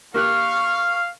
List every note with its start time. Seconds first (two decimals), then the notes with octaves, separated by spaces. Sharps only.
0.14 A#3 G4 F5 C#6 F6 F#6